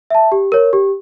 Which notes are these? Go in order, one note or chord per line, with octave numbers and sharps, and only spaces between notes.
E5 A5
G4
A#4 C#5
G4